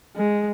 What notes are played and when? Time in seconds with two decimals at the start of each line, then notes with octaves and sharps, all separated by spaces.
0.17 G#3